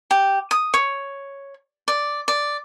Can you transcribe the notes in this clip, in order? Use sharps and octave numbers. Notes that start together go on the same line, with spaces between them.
G4
D#6
C#5
D5
D5